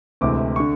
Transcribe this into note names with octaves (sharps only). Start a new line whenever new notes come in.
D2 C3 E3 G#3 D6
D3 C#6